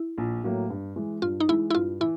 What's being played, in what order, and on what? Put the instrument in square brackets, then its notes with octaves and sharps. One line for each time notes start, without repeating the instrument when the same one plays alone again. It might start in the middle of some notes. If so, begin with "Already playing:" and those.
Already playing: [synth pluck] E4
[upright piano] A#1
A2 F#3 A#3
G2
E3 G#3
[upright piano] G2 [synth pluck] F4
[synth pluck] D#4
[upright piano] E3 G#3 [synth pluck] E4
[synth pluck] E4
[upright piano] G2 [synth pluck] F4
[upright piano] E3 [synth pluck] E4